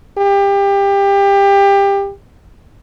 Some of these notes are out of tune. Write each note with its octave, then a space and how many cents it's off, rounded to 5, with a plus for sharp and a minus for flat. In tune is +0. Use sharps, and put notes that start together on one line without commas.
G4 +25